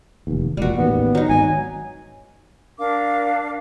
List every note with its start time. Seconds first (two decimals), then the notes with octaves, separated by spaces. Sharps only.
0.27 F1 D#2
0.57 E1 A#2 G3 F#4
0.77 A1 D#2 B3
1.15 F#3 D#4
1.29 G#1 G#5
2.79 D4 A#4 F5 D6